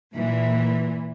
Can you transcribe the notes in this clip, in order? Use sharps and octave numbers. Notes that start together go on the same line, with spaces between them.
A#2 E3